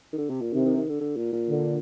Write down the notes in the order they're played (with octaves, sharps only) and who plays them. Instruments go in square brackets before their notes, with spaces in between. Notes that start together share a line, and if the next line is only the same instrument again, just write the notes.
[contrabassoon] D#3
D3
C3
A#2
[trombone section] C3 [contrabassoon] D#3
[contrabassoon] D#3
D#3
D3
D3
A#2
A#2
[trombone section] D3